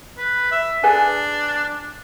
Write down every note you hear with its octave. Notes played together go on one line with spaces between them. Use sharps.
B4
E5
D4 G#4 B4 G#5